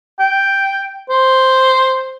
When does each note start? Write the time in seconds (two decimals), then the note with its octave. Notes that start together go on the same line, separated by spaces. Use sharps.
0.19 G5
1.10 C5